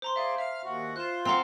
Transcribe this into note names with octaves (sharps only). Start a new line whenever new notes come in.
C5 A#5 C6
G#4 C5 D5 E5 F5
E5 F5 F6
D#2 F#4
F4 C5 F#6 E7
C4 F5 F#5 A#5 C6